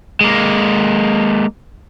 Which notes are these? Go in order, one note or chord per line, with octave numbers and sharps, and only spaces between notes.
G#3 A#3